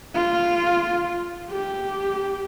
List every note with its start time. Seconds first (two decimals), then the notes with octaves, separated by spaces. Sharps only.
0.15 F4
1.50 G4